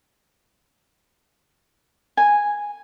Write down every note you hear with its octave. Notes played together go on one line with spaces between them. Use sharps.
G#5